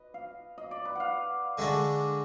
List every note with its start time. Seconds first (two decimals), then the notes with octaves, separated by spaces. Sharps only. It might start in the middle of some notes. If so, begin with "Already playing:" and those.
Already playing: B4 D#5
0.14 F5
0.58 D#5
0.71 D5
0.85 B4
0.95 F5 F#5
1.58 D3 G#3 D4 F#4